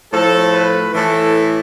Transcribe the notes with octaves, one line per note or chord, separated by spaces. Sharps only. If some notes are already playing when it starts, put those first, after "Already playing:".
A2 F3 A4
B4
A2 E3 A4